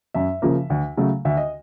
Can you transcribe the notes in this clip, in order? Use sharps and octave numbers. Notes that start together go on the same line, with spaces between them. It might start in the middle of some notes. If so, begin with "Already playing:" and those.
F#2 E5
C#3 F3 A#3
D2
C#3 F#3 A3
D2 E5
D#5